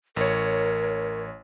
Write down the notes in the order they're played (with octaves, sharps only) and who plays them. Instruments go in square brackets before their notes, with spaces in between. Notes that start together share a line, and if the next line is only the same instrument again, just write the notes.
[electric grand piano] A1 C#5 [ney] A#4